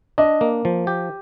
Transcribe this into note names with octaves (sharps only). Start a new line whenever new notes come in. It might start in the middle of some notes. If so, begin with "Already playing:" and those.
D4 D#5
A#3
F3
G4